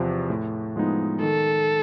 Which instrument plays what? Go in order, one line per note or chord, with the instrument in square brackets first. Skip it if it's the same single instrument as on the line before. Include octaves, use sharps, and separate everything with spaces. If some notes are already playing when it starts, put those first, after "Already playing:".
Already playing: [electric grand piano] E2 C3 F3
A2
F3 G#3 B3 D#4
[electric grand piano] D#3 [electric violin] A4